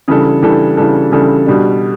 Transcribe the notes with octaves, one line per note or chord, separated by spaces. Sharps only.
C#3 E3 G3 D4 A4
C#3 E3 G3 D4 A4
C#3 E3 G3 D4 A4
C#3 E3 G3 D4 A4
B2 G3 D4